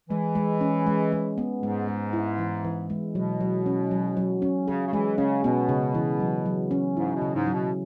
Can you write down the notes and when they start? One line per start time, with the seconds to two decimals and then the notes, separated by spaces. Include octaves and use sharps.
0.09 E3 G#3
0.35 G#3
0.61 C#4
0.87 G#3
1.12 G#3
1.38 B3
1.62 G#2 G#3
1.88 G#3
2.13 E4
2.39 E3
2.64 E3
2.90 G#3
3.15 B2 F#3
3.41 F#3
3.66 C#4
3.91 F#3
4.17 F#3
4.42 C#4
4.68 C#3 G#4
4.87 C#3
4.93 E3 G#3
5.18 C#3 C#4
5.44 B2 B3
5.69 C#3
5.95 E3
6.20 F#3
6.46 F#3
6.71 C#4
6.97 G#2 E4
7.15 B2
7.22 C#3
7.34 G#2
7.47 F#3
7.54 B2